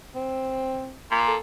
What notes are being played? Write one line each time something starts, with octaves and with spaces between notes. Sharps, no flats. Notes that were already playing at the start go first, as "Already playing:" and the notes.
C4
A#2
A4